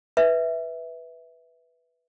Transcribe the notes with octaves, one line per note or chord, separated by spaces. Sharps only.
B4 E5